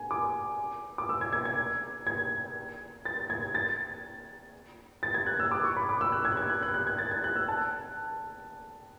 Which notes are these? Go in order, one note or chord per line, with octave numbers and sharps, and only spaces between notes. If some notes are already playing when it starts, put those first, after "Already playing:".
Already playing: G#5
D6
D6
E6
G#6
G#6
G#6
G#6
A6
G#6
A6
A6
G#6
F#6
E6
D6
C#6
B5
D6
E6
F#6
G#6
F#6
G#6
F#6
F#6
F#6
G#6
A6
G#6
F#6
E6
A5